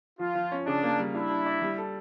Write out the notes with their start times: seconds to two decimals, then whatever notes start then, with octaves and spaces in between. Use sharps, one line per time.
0.19 F3 F4
0.35 F3
0.52 C#4
0.67 C#3 D4
0.83 A#3
0.99 G3
1.15 D4 E4
1.30 D4
1.46 D5
1.62 G3
1.78 A4